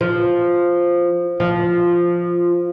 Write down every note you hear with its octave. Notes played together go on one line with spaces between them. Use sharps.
F3
F3